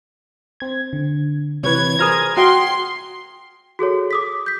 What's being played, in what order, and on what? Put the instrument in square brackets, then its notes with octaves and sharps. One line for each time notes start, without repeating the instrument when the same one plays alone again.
[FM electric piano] C4 G#6
D3
[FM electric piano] C3 E3 [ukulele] B4 C#5 [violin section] G#6
[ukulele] G#4 A#4 C5 [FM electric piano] D#6 F6 A#6
[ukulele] F#4 G5 [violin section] C6
[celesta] F#4 G#4 A4 C#5
D6 D#6 B6
G6 B6